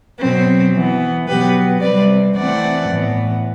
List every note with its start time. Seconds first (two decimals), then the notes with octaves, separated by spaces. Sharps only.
0.20 B2 F#3 C4
0.74 E3 B3
1.27 B2 F#3 B3 G4 B4
1.81 C3 G3 C4 B4 D5
2.36 E3 A3 C4 D5 F#5
2.89 A2 E3 B3